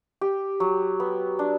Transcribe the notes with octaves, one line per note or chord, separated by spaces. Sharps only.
G4
F#3
B3
D4